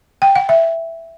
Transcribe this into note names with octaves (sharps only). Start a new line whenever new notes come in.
G5
F#5
E5